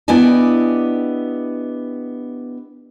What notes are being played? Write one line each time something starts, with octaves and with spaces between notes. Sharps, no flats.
B3 D4 E4 G4 D#5 G#5